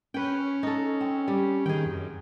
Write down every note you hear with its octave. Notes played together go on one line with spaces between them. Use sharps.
C#4 B4 G5
D#4 A4
C4
G3 G4
D#3 G#4 G5
F#2